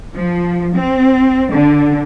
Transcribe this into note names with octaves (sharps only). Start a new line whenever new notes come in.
F3
C4
D3